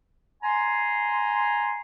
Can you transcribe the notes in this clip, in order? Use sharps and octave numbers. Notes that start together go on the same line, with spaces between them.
G#5 A#5 C6